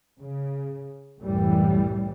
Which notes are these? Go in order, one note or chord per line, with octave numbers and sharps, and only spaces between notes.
C#3
C2 F#2 A2 E3 G3